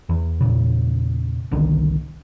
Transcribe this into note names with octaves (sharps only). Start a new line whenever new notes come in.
E2
E2 A#2 C#3
G1 C2 D3 D#3